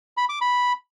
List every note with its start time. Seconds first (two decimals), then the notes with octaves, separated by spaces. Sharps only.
0.17 B5
0.29 D6
0.41 B5